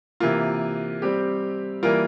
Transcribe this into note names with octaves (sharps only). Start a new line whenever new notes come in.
C3 E3 A#3 F4
G3 C4 G4
E3 G3 A#3 F4 A#4